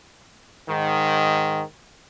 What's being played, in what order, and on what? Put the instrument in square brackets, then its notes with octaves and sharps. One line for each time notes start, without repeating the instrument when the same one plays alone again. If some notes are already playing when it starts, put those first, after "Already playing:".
[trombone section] G#2 D#3